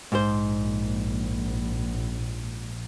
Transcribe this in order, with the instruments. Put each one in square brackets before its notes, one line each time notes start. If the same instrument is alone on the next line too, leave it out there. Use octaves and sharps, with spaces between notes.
[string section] A#1 [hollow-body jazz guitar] G#2 C5